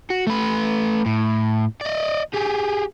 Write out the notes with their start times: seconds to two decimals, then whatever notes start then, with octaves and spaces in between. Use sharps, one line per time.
0.10 F#4
0.27 A3 B4
1.06 A2
1.81 D5 D#5
2.34 G4 G#4